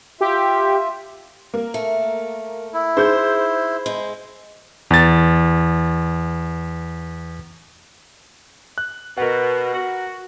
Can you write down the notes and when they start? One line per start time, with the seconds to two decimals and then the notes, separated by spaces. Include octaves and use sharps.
0.21 F4 G4 E5
1.54 A#3
1.74 A3
2.74 E4
2.97 D#4 G#4 C5 G6
3.86 G#3
4.91 E2 A6
8.78 F#6
9.18 B2 A#4 F#5
9.74 F#4